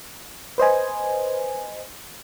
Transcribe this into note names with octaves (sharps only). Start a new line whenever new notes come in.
B4 C5 D#5 G#5